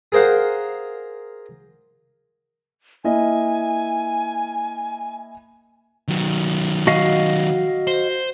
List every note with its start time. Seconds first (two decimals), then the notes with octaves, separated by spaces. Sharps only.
0.12 G#4 A#4 C5 F5 F#5
3.04 A#3 E4 D#5 G#5
6.08 D#3 F#3
6.87 F#4 D#5 F5
7.87 C5